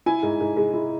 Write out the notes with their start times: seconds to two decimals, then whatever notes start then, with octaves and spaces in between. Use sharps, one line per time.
0.06 E4 G#5
0.23 G#2
0.40 G#2
0.56 G#3
0.74 E4